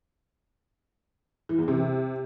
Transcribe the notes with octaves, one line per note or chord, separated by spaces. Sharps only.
E3
E2
C3